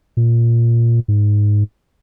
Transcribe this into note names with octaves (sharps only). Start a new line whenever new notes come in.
A#2
G#2